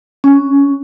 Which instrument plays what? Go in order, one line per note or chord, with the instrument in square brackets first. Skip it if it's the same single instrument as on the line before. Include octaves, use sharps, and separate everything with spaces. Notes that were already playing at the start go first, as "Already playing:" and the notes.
[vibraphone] C#4